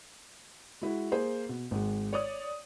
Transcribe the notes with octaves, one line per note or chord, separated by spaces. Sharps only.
G#3 E4 F#4
A#3 G#4 C5
B2
G#1 G#3
C#5 D5 D#6